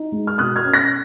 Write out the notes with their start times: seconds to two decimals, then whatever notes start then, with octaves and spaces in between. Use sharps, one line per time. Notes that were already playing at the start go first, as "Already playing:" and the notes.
Already playing: D#4
0.12 G#3
0.27 F6
0.38 B2 D#6 F#6
0.56 F6 G#6
0.65 C#4
0.74 F#6 A#6